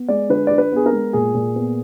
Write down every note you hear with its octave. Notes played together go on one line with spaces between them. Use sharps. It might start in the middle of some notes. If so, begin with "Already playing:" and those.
Already playing: B3
G#3 D5
D3 B4
D3 D5
B4
B3 G#4
A#4
G#3
A#2 G#4
A#2
B3